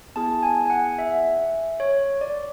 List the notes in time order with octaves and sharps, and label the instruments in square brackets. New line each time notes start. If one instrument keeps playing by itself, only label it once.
[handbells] B3 E4 G#4 A5
G#5
G#5
F#5
E5
C#5
D5